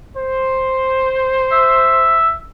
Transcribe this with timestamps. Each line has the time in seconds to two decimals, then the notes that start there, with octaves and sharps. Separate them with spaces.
0.16 C5
1.52 E5